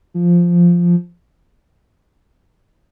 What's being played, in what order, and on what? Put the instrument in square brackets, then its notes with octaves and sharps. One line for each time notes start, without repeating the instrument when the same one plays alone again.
[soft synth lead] F3